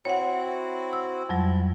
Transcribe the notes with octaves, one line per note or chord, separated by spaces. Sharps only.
C4 E4 F#4 C#5 F#5
E6
F2 F#3 G3 E4